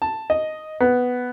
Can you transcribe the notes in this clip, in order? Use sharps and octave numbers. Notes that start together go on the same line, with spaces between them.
A5
D#5
B3